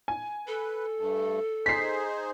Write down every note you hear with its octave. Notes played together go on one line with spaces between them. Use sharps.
G#5
A4 B4
G2 A3
D#4 G#4 C5 B6 C7